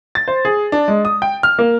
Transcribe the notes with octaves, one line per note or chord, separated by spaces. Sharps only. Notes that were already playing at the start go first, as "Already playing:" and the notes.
A6
C5
G#4
D4
G#3
D#6
G5
F6
A#3